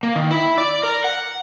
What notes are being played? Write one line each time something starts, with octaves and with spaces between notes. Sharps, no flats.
A#3
D#3
E4
D5
A#4
F#5